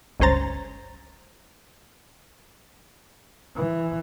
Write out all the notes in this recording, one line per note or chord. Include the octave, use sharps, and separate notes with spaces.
G1 C#2 C#4 C5 A#5 A6
E3